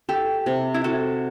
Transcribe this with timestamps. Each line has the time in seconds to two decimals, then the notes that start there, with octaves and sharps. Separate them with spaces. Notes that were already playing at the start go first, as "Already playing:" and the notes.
0.09 G4 A4
0.46 C3
0.74 E4
0.84 F#4 A4